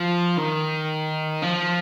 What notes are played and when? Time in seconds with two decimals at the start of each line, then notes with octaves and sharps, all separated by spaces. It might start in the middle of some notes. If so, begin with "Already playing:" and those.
Already playing: F3
0.38 D#3
1.42 F3